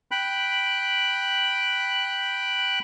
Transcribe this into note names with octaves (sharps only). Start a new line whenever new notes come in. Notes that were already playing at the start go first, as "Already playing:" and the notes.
G5 B5 F#6